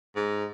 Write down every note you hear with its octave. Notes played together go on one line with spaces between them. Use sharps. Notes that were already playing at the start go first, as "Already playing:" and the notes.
G#2